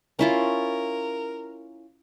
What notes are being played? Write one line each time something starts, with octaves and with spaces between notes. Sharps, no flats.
C#4 E4 F4 A#4